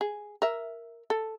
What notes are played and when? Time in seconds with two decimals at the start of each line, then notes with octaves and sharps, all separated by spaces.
0.01 G#4
0.42 A#4 E5
1.10 A4